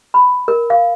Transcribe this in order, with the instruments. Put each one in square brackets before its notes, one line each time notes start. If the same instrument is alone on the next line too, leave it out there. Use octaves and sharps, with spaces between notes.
[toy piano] B5
A#4
F5